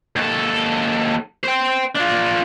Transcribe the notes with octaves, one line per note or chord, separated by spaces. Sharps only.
D#2 A4
C5 G5
D4 F4